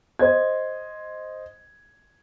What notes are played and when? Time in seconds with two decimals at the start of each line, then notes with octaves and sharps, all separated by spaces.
0.19 C5 D#5 G#6